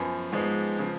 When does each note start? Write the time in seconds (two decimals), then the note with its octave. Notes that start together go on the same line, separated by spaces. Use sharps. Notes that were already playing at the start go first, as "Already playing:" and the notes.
Already playing: F#2 F3 B3 G#5 B5
0.32 G#2 F3 G#3 B3
0.79 C#3 F3